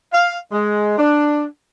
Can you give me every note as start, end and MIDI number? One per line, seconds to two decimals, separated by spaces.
0.13 0.36 77
0.52 0.97 56
0.98 1.45 62